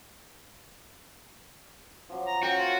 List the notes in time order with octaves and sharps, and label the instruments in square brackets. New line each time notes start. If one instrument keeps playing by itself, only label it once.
[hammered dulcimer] F3 F#3 D5
[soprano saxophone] A#5
[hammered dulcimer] C#4 F4 A#4 [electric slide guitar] F#4 [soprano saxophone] G5
[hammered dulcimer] A#3 C#5 [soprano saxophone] F4